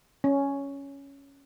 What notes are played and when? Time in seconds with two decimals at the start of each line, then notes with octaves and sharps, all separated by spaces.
0.24 C#4